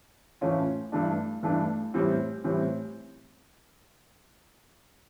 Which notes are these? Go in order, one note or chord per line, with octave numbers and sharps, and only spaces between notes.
A2 E3 A3 C#4 F4
G2 E3 A3 D4
G2 E3 A3 D4
A2 E3 G3 C4
A2 E3 G3 C4